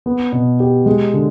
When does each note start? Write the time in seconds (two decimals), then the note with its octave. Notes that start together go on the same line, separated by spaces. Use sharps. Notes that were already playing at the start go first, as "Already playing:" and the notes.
0.06 B3
0.32 B2
0.60 G4
0.86 G#3
1.14 D3